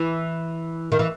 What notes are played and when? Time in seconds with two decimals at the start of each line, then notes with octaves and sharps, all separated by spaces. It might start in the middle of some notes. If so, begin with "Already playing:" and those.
Already playing: E3
0.92 D#3
0.99 E3